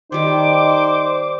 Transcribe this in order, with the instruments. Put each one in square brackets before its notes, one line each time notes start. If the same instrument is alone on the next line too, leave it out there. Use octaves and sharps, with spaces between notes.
[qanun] D#3 G3 [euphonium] D#4 [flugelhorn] C5 [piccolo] D6